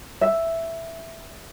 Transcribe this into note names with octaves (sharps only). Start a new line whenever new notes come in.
E5